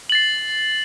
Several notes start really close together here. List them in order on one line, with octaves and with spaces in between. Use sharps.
F#7 A6 C7